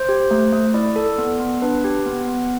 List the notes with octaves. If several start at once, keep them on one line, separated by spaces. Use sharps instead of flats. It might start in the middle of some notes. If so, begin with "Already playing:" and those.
Already playing: C5
G4
A3
A3
E4 D5
A4
B3
B3
D4 B4
G4
B3
B3